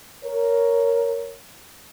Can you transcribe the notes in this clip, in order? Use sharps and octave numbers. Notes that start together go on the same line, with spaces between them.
A#4 C#5